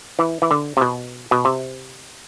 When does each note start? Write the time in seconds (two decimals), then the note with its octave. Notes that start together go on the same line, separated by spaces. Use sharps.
0.19 E3
0.42 E3
0.51 D3
0.77 C3
0.81 B2
1.31 B2
1.45 C3